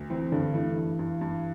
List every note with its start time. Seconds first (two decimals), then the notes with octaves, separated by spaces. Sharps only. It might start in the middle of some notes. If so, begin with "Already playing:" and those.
Already playing: D2
0.10 E3 C4 E4
0.32 G2 D3 D4
0.54 E3 A3 E4
0.77 G2
0.99 G2
1.21 G2